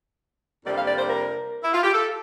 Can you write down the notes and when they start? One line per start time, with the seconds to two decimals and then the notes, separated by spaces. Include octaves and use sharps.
0.65 F2 C3 G3 A#3 D4 D5
0.76 F5
0.86 D5
0.98 C5
1.09 A#4
1.63 E4
1.73 F4
1.83 G4
1.93 A4